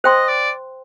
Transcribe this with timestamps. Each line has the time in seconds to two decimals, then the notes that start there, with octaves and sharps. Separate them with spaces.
0.04 C5 D#5 G5 C6
0.28 D5